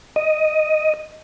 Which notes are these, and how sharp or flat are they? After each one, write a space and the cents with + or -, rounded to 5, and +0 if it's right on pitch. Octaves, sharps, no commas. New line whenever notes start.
D#5 +0